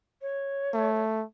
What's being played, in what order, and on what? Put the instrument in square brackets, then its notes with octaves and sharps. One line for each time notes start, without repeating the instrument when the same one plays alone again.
[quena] C#5
[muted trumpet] A3